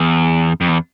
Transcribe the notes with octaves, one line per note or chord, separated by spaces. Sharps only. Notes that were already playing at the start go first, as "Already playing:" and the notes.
Already playing: E2
F2
E2